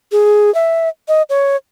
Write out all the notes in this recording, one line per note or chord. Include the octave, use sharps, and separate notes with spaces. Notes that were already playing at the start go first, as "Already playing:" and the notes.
G#4
E5
D#5
C#5